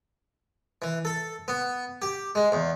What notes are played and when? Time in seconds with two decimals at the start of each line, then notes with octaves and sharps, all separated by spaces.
0.82 E3
1.05 A4
1.48 B3
2.02 G4
2.35 G#3
2.52 E2